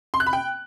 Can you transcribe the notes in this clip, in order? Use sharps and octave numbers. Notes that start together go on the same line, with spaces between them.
C6
F#6
B5
G5